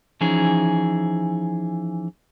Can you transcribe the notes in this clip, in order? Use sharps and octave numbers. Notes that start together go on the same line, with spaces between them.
E3 F3 C#4 D#4 G#4